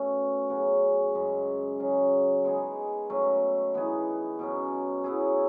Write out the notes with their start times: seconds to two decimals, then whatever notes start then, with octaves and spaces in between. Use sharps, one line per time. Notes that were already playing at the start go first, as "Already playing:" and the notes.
Already playing: B2 A3 C#4
0.49 C#3 F#3 C#4 F#4
1.15 F#2 C#3 G#3 C#4
1.79 C#3 F#3 C#4 G#4
2.45 G#3 B3 D#4 G#4
3.10 F#3 A3 C#4
3.74 E3 B3 D#4 G#4
4.39 B2 F#3 C#4
5.04 F#3 B3 E4 G#4